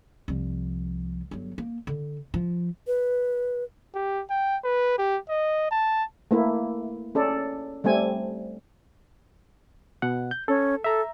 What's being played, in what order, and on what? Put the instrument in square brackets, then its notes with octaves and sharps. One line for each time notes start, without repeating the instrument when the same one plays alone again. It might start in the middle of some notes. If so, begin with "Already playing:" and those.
[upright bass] C2 F3
G1 F#3
A#3
D3
F3
[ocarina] B4
[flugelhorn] G4
G5
B4
G4
D#5
A5
[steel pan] A3 A#3 E4
C#4 A4 D5
G3 A3 C4 G#5
[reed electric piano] B2 F#5
G6
[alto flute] C#4 [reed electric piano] A4
[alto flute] A4 [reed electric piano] E5 A#5